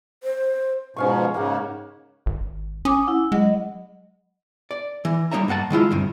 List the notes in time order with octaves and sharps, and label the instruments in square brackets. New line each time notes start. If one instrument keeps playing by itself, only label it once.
[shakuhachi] C5
[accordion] G#2 B2 F3 [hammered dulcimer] C#4 F5 C#6
[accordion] G#2 C#3 [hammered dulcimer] A#3 G4 F#5
[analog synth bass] G#1
[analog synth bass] C#4 [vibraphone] G#5 D6 D#6
[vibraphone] E4 F#5
[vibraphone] F#3 D#5 F#5 [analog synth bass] G#3
[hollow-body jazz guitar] D5
E3
G3 A#3 D#4 C#5 E5 A#5
G2 A#3 F#5 A5
D#3 G#3 E4 F4
D2 G2 C3